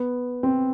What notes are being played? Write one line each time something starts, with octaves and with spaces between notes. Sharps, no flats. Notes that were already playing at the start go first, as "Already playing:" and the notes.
Already playing: B3
C4